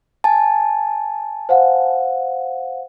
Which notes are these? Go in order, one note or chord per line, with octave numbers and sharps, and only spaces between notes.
G#5 A5
C5 F5 F#5